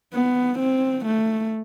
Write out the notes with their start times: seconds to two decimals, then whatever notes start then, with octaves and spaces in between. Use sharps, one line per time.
0.14 B3
0.59 C4
1.05 A3